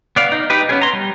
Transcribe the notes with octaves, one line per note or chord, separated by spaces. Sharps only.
B3 D5 F5
D#4
D#4 G4 B4
B3 C#4 G#4
A#5 C6
G3